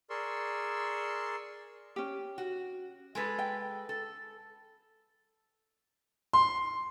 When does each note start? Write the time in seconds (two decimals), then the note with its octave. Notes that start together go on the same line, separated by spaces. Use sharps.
0.10 G#4 A#4 D5 C6 C#6 E6
1.96 C#4 G4
2.38 F#4
3.15 G#3 A4 B4
3.39 G5
3.89 A4
6.33 C6